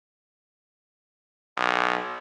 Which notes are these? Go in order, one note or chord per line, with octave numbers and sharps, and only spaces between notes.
B1